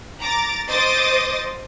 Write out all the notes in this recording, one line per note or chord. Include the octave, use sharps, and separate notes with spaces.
A#5 D6 A6
C5 D#5 D6 D#6 A6